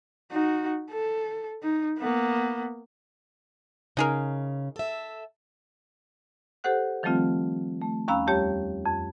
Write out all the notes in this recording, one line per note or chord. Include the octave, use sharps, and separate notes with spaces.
D#4 F#4
A4
D#4
A#3 B3
C#3 D#4 G#4 A#4
A4 E5
G4 A4 C5 F#5 F#6
D#3 F3 G3 A3 C4 F4
A3
D#2 C#4 F5 A#5 B5 E6
F2 G3 G4 C#5
F2